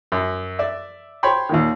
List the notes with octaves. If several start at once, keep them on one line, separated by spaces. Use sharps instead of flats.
F#2
D5 E5
C5 C#5 G5 B5 C6
D#2 A#2 D#3